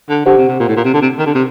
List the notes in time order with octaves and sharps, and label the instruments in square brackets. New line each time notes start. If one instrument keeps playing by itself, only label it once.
[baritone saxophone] D3
[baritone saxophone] D3 [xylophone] G4 C5 F#5
[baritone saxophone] C3
C3
A#2
A2
A#2
C3
D3
C3
D#3
D3
C3